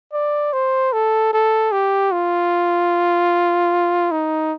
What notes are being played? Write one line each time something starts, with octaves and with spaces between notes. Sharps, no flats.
D5
C5
A4
A4
G4
F4
D#4